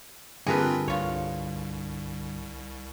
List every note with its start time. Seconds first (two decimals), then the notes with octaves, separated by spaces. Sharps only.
0.47 G2 D3 C4 F4 G#4 A#4 B4
0.88 C2 F4 C#5